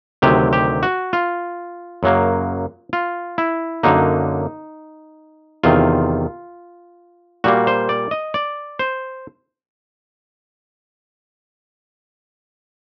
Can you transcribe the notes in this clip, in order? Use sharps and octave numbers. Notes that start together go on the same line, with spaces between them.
D2 C3 D#3 F#3 G4
G4
F#4
F4
F#2 C#3 F#3 A#3
F4
E4
F#2 D3 F#3 A#3 D#4
E2 C3 D#3 F4
A#2 G3 A#3 F#4
C5
D5
D#5
D5
C5